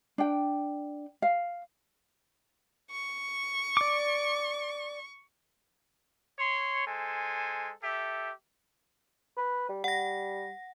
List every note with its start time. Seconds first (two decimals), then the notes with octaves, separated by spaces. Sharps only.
0.18 D4 G5
1.22 F5
2.91 C#6
3.77 D5 D6
6.39 C#5 C6
6.86 G#3 A4 C5 G#5
7.83 G4 A4 E5
9.37 B4
9.69 G3
9.84 G3 F#5 A#6